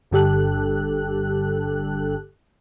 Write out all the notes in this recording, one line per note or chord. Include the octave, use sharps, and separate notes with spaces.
G1 G2 D3 G4 A4 F#6